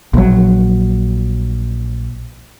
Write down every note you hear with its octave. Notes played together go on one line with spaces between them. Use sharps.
A#1 F#3